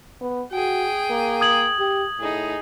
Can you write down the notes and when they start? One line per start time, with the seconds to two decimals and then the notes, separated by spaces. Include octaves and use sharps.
0.21 B3
0.52 F#4 G#4 G5
1.10 A#3
1.41 D#6 G#6 F#7
1.79 G4
2.19 A2 D#4 G#4